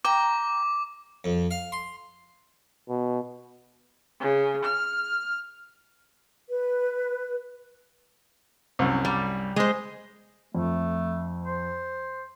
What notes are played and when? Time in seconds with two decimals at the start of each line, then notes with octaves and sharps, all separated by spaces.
0.05 G5 A#5 D6
1.24 F2
1.51 F5
1.72 C6
2.89 B2
4.19 C#3
4.64 F6
6.49 B4
8.79 C2 F#2
9.05 G3
9.56 G#3 C5
10.55 F2 A3
11.43 C5